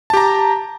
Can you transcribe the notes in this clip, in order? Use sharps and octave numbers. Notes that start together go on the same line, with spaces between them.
G4 A5 A#5